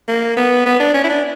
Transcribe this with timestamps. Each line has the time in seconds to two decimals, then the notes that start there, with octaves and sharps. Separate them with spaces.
0.08 A#3
0.37 B3
0.66 B3
0.80 D4
0.94 C#4
1.04 E4
1.09 D4